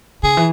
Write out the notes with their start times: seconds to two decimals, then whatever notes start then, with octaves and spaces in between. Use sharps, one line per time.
0.23 C#3 G#4
0.37 E3